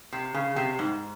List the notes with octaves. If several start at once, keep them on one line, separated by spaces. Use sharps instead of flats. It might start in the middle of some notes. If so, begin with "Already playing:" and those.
C3
C#3
C3
G#2